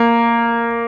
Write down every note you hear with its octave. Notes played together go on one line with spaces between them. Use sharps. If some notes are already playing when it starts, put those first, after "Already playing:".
Already playing: A#3